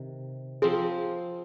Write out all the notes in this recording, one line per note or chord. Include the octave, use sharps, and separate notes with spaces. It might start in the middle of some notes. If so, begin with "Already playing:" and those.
Already playing: C3 D#3
F3 C4 F4 G#4 C5